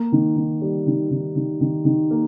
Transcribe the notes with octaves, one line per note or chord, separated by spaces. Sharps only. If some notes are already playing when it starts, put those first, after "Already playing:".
Already playing: A#3
D#3
D#3
G3
D#3
D#3
D#3
D#3
D#3
A#3